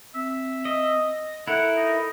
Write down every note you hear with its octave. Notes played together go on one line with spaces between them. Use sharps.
C4 E5
D#5
E4 A4 A#4 F#5
D#4